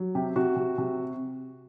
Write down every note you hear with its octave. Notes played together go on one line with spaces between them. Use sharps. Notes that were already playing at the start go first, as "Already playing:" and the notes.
Already playing: F#3
C3 G4
C3 F#4
C3
C3